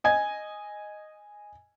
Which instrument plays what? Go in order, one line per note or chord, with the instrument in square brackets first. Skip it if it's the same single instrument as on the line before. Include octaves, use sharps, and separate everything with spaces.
[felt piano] D#5 G#5 G#6